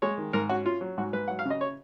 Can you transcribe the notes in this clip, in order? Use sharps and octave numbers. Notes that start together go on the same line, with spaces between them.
G#3 C#5
D#3
G#2 A#4
C#4 F#4
C#4 F4
F#3
G#2 F#4
G#2 B4
F#3 F#5
F5
C#3 D#5
C#5